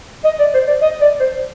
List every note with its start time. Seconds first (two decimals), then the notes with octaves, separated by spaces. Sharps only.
0.24 D#5
0.39 D5
0.54 C5
0.67 D5
0.82 D#5
1.01 D5
1.20 C5